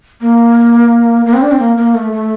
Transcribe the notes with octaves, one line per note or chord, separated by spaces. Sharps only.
A#3
A#3
C4
D4
C4
A#3
A#3
A3
A3